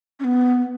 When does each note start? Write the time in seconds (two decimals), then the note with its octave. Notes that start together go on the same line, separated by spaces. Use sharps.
0.20 C#4
0.24 B3